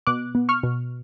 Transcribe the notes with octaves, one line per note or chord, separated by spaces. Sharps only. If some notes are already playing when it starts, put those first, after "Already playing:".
B2 D6 F#6
B3
C#6 F6
B2